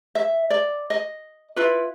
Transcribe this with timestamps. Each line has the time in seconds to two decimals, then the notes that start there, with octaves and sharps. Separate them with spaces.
0.15 E5
0.50 D5
0.90 D#5
1.56 E4 F4 B4